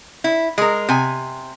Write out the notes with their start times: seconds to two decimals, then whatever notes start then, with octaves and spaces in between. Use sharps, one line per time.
0.24 E4
0.58 G#3 A#4
0.89 C3 G#5